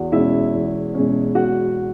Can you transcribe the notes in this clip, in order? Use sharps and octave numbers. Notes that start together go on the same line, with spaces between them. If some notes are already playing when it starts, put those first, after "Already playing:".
Already playing: E2 F#4 F#5
B2 G#3 C#4 E4 E5
E2
B2 G#3 C#4
F#4 F#5